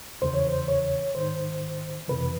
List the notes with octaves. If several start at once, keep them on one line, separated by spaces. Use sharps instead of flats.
E2 C#3 E3 C5
C#5
C5
C#5
G#2 D#3 C5
F2 C3 E3 B4